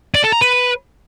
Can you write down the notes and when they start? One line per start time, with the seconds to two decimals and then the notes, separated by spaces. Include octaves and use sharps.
0.15 D5
0.24 A4
0.32 A#5
0.41 B4